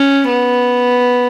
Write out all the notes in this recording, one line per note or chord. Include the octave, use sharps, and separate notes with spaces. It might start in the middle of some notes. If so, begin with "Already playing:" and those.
Already playing: C#4
B3